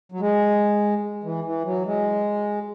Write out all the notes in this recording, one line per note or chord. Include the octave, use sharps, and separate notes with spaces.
F#3
G#3
E3
E3
F#3
G#3